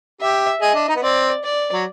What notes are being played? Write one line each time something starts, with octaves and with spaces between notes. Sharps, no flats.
G4 E5
G#4 D#5
D4
D#4
B3
C4 D5
D5
F#3